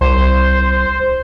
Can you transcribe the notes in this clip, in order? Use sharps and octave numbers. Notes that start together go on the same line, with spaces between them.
C2 C5